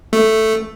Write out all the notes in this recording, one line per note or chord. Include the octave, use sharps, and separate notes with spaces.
A3